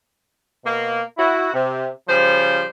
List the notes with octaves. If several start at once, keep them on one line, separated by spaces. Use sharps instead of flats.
B2 A#3
E4 F#4
C3
C#3 F3 G3 C5